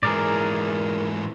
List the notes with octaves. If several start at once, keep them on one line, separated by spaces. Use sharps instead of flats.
G#2 E3 G#4 A#4 D5